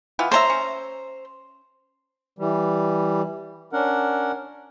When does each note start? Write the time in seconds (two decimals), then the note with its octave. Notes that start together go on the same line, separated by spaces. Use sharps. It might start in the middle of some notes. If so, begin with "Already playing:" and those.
0.19 E3 B3 F4
0.32 C5 C#5 E5 A#5
0.50 C#4
2.39 E3 G3
3.73 C#4 D4 A#4 F#5